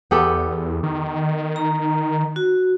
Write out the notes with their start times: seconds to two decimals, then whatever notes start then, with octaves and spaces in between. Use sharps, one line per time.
0.11 E2 B3 G4 A4
0.83 D#3
1.56 A#5
2.36 F#4